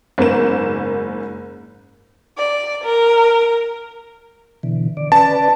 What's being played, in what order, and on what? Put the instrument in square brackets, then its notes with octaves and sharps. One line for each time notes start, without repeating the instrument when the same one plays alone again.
[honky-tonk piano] F#1 G#2 A#3 B3 A#4 E7
[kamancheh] D5
A#4
[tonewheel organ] B2 D3 E3
D3 D5
[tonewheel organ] C#4 B4 D5 [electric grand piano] A5